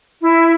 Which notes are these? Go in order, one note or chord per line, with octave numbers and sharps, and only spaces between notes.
E4